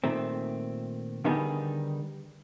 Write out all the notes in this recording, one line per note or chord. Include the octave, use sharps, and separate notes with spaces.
A#2 D#3 A3 C4
D3 D#3 G3 B3 D#4 G#4